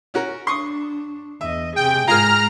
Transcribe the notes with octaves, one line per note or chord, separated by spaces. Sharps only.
C#4 F#4 A#4
D4 C6 C#6 D#6
E2 D#5 E5
C3 G#4 G5
G#2 F4 G#4 A#4 A#5 F6